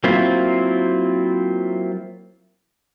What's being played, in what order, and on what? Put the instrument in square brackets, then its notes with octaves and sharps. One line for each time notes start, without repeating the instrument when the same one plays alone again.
[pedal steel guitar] F#3 A#3 C4 E4 F4